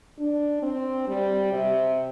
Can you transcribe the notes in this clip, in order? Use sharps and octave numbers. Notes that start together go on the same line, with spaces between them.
D4
C4
G3
C3